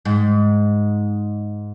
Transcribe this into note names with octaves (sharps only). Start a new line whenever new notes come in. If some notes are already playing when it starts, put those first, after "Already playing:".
G#2